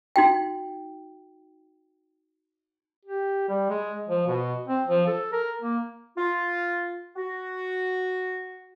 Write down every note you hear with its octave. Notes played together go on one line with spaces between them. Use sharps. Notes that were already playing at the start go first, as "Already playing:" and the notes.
D#4 F#4 G5
G4
G3
G#3
F3
B2
C4
F3
A4
A#4
A#3
F4
F#4